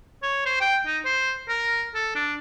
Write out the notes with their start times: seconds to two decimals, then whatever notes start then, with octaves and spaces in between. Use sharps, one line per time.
0.23 C#5
0.46 C5
0.61 G5
0.86 D#4
1.05 C5
1.48 A#4
1.95 A4
2.15 D4